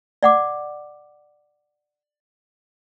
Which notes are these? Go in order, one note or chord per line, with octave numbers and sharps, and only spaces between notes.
D5 F#5 D6